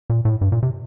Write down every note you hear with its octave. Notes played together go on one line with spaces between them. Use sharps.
A#2
A2
G2
A#2
C3